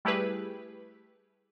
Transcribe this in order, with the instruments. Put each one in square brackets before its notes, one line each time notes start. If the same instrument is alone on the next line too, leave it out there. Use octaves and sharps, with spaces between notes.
[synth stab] G3 A3 E4 G4 G#4 B4